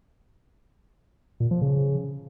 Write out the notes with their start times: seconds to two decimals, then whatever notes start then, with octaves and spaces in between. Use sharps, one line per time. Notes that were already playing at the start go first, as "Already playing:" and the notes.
1.40 A#2
1.51 F3
1.62 C#3